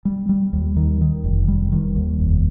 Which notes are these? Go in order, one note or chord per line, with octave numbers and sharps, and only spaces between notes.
G3
G3
D#2
D#3
D#3
F1
G3
D#3
D#2
F1